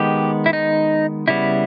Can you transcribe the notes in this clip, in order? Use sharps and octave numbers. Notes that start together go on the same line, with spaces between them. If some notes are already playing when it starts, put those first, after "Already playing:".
Already playing: D#3 G#3 B3 G4
E4
D#4
C#3 G3 B3 E4